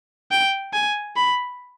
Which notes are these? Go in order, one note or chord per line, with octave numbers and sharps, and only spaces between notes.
G5
G#5
B5